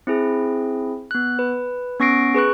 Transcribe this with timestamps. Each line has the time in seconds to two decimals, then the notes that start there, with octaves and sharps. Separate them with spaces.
0.07 C4 E4 G#4
1.11 B3 F#6
1.39 B4
1.99 B3 C#4 C#6 A#6 C7 D7
2.34 G#4 B4 C#6 F#6